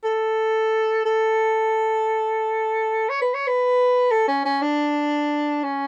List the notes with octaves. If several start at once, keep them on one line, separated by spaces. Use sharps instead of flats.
A4
A4
C#5
B4
C#5
B4
A4
C#4
C#4
D4
C#4